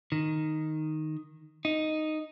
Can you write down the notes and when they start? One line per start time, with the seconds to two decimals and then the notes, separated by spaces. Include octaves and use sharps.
0.12 D#3
1.65 D#4